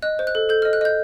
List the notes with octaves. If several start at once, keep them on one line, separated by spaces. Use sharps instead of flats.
D#5 F#6
C5
F#6
A4
A4 G6
D#5 F6
F#6
D#5 G6